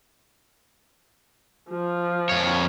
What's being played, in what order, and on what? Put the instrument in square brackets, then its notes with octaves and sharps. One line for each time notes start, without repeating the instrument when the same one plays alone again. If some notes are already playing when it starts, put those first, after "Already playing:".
[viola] F3 F4
[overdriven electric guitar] F2 C#5